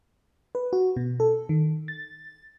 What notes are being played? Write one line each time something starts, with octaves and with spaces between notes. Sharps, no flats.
B4
F#4
B2
A4
D#3
A6